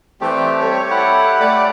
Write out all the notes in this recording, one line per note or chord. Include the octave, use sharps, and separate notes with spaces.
E3 G3 A3 C4 G4
G3 A4 C#5
E4 G4 F#5
A3 D5